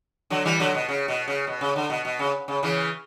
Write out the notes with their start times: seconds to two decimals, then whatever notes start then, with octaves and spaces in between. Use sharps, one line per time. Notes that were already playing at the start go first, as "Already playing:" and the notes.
0.30 D3 F#3
0.45 E3 G3
0.60 D3 F#3
0.74 B2
0.89 C#3
1.08 B2
1.28 C#3
1.47 B2
1.61 C#3
1.76 D3
1.90 B2
2.05 B2
2.19 C#3
2.48 C#3
2.63 C#3 E3